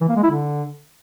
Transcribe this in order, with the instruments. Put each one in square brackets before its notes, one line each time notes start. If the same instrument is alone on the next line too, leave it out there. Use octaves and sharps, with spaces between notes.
[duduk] E3
A#3
G#3
E4
D3